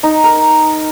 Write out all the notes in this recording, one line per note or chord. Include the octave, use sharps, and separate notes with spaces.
D#4
A#4